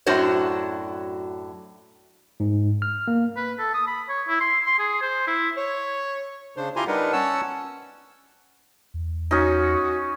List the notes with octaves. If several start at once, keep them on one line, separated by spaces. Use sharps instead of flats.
F#2 A2 D4 F#4 C5 C#5
G#2
F6
A#3
B4
A4
D#6
B5
C#5
E4
C6
C6
G#4
C5
E4
C#5
C#3 D4 C5
E4 F4 G4 G#5 A#5 C6
G3 D4 D#4 A#4 B4 F#5
C#4 C#5 F#5 A5 E6
E2
C#4 D#4 F#4